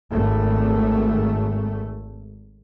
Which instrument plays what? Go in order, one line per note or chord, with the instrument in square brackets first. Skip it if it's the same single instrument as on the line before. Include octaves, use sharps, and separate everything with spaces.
[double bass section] G#1 A3